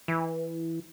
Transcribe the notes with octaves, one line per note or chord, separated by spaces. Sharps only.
E3